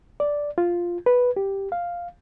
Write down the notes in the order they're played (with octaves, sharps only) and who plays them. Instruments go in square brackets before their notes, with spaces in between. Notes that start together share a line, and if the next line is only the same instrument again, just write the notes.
[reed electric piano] D5
F4
B4
G4
F5